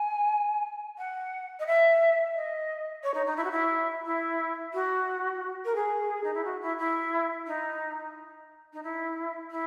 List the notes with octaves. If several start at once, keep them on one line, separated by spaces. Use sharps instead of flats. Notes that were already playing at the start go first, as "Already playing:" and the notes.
Already playing: G#5
F#5
D#5
E5
D#5
C#5
D#4
D#4
E4
F#4
E4
E4
F#4
A#4
G#4
D#4
E4
F#4
E4
E4
D#4
D#4
E4
E4